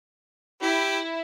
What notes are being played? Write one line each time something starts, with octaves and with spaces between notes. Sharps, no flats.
E4 G4